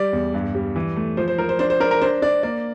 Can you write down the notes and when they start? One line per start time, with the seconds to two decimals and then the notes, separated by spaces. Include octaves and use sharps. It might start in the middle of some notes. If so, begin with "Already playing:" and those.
Already playing: G3 D5
0.13 E2
0.34 G2
0.55 G3
0.76 E3
0.96 A3
1.17 F3 C5
1.28 C5
1.38 F3 A#4
1.49 C5
1.59 D4 C5
1.70 C5
1.80 D4 A#4
1.91 A#4
2.02 D4 C5
2.22 D4 D5
2.43 A#3 D5